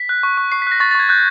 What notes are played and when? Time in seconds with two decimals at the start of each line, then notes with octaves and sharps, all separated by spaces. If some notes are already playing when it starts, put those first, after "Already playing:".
Already playing: B6
0.09 F#6
0.23 C#6
0.37 C#6
0.52 C#6 C7
0.62 B6
0.67 F#6 A#6
0.80 C#6 A6
0.91 A6
0.95 C#6 G#6
1.09 F#6 G6